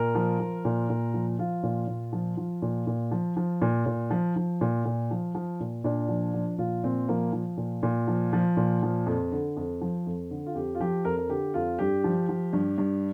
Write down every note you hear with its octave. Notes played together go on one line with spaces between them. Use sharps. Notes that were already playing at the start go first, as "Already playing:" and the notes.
Already playing: A#2 A#4
F3
F3
A#2
A#2
F3
F3 F4
A#2
A#2
F3
F3
A#2
A#2
F3
F3
A#2
A#2
F3
F3
A#2
A#2
F3
F3
A#2
A#2 D4
F3
F3
A#2 F4
A#2 C4
F3 A#3
F3
A#2
A#2
F3
F3
A#2
F3
F2
D3
F2
F3
F2
D3
F4
F2 G4
F4
F3 G4
F2 A#4
A#4
D3 G4
F2 F4
G2 G4
F3
F3
G2
G2